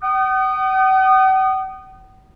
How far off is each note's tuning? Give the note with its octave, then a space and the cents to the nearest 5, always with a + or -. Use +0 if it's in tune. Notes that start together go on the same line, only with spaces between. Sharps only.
F#5 +45 D#6 -25